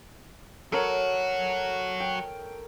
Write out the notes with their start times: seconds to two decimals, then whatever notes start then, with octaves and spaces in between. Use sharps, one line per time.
0.72 F#3 F#4 A4 A#4 C#5
2.00 G5